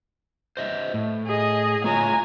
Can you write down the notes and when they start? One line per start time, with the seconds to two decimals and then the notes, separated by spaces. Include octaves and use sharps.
0.57 C5 D#5 E5
0.94 A2
1.26 G#4 D#5
1.84 A3 F4 C#5 G#5 A#5